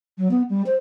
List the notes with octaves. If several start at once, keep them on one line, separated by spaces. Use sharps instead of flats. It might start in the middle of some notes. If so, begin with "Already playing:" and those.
F#3
B3
G3
C5